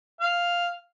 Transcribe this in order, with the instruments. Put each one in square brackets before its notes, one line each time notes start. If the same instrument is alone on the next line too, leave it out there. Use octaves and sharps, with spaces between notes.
[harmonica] F5